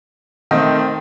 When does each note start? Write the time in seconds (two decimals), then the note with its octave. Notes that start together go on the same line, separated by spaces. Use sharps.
0.51 D#3 A3 C4 D#4